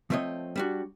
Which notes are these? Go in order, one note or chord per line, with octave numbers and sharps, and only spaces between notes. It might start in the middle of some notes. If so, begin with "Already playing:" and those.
F3 A3 C4 C#5 D#5
G3 D4 F#4